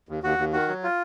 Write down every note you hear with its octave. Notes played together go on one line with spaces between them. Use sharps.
D#2
D#2 F#4
D#2
D#3 F#4
F#3
F4